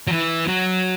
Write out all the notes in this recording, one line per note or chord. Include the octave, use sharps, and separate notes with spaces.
F#3
E3
F#3